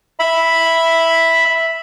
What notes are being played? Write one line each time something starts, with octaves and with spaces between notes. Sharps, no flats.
E5 B5